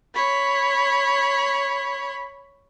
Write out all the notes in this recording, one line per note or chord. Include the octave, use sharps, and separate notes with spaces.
C#5 B5